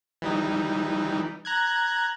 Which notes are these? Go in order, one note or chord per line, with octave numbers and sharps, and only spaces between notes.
E3 G3 D#4
A#5 F#6 G#6